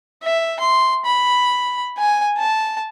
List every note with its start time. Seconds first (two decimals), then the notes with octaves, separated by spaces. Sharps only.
0.23 E5
0.60 C6
1.05 B5
1.98 G#5
2.37 A5